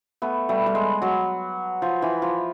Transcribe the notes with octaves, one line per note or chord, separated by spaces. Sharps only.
A3 B3
G3 A3
G3
G#3
F#3
F3
E3
F3